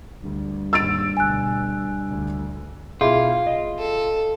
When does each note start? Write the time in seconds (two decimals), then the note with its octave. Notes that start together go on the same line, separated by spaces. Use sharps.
0.23 D2 G2
0.73 D#2 G#2 E6 A6 D7
1.17 D2 B2 G#5 F#6
2.09 D2
3.01 B1 E4 F4 G#4
3.46 D#5
3.79 A4